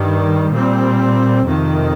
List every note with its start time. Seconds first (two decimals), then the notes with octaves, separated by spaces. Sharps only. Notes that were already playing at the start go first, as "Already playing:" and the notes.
Already playing: G2 D#3 G3
0.52 A#2 G3 C4
1.45 F2 C3 D#3